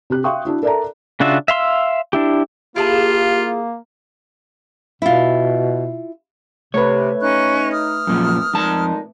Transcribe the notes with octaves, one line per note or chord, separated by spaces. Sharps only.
C3 G4 F#6
E5 F5 G5 C6 C#6 D#6
D4 E4 F#4
A4 A#4 D5 E5 A5 A#5
C#3 D4 F4 F#4 E5
E5 F5 C6 E6
D4 E4 G4
A#3 E4 F4 G4 G#4 A5
B2 E4 F4
C3 A3 B4 C#5
C#4 D#4 C#6 F#6
D#6 F6
F#2 A#2 F3
F2 A#2 G#3 D#4 A5